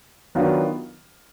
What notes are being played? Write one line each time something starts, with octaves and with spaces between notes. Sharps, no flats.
D#3 F#3 B3 D4 F4